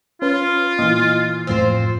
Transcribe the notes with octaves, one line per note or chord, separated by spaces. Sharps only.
C#4 F4 B4
A#2 E3 D#5
F2 A2 C4 F4 C5 C7